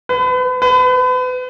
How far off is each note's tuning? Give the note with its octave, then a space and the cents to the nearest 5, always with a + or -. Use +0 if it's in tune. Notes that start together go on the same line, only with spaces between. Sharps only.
B4 +35
B4 +35